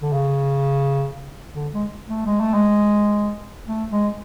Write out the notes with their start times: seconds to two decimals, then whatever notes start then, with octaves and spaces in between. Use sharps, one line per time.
0.02 D3
0.13 C#3
1.55 D3
1.73 G#3
2.09 A3
2.26 G#3
2.40 A3
2.54 G#3
3.68 A3
3.92 G#3